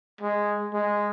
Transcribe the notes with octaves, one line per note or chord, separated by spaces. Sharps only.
G#3
G#3